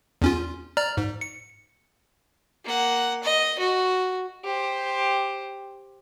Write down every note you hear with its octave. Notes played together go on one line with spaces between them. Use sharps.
E2 C#4 F4
D5 A#5 F6
G#2
C#7
A#3 F#5
D#5
F#4
G4 C5